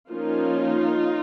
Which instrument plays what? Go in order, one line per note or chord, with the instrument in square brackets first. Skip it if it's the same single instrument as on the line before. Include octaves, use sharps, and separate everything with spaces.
[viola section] F3 A#3 C#4 D#4 F4